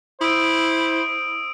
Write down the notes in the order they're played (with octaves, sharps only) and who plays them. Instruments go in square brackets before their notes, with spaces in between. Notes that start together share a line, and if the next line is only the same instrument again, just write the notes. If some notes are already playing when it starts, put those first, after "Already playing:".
[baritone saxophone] E4 [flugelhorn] C5 [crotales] D#6 E6 D7